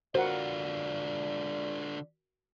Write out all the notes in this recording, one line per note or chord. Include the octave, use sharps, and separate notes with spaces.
D3 F4 F#4 A#4 C5 D5 F#5